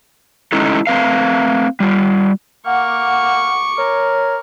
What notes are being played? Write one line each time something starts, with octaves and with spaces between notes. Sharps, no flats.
G#3 C#4 D#4 E4 A4
A3 C4 B4 F5
G3 F4
A#3 F#5 C#6 D6
A#4 C#5